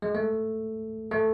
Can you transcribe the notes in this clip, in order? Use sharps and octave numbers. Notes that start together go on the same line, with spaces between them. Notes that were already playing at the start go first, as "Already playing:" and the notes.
G#3
A3
A3